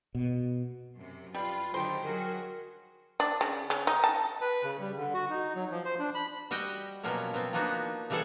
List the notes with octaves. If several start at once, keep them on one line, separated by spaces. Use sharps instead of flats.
B2
F#2 C3
G3 F4 B4
D3 D#3 F#3 D#4 G4 C5
F#3 F#4 G#4 A#4
D4
C#3
C#3
D#4
A5
B4
C#3
G3
D3
F#4
D#4
F#3
F3
C5
D4
B5
G3 F#4 D#5 G5
B2 F3 F#3 A#3 C#4
F#3 B3 C4
F3 A#3 B3 D4 D#4 F#4
C#3 E3 G3 G#4 A4 F#5